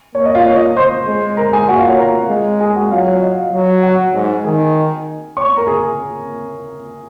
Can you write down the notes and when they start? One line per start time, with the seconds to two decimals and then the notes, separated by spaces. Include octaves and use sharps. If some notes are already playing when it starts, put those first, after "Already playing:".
0.15 A#3 C#5
0.25 D#5
0.35 F4 F5
0.46 C#5
0.56 D#5
0.77 C5 C6
1.06 G#3
1.37 A#4 A#5
1.53 G#4 G#5
1.69 A#3 F#4 F#5
1.78 F4 F5
1.89 C#5
1.99 A#4 A#5
2.29 G#3
2.60 G#4 G#5
2.75 F#4 F#5
2.91 F#3 F4 F5
3.07 C#5
3.22 D#5
3.53 F#3
3.83 F#4 F#5
4.14 G#2
4.44 D#3 G#4 G#5
5.37 C#5 C#6
5.57 A#4 A#5
5.67 G#4 G#5